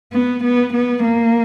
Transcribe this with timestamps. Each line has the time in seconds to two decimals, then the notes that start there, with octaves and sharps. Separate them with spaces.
0.13 B3
0.44 B3
0.73 B3
1.04 A#3